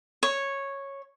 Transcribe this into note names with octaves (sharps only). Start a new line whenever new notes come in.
C#5